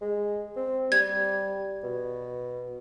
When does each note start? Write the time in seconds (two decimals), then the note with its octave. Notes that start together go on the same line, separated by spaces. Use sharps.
0.01 G#3
0.56 C4
0.92 G3 G#6
1.83 B2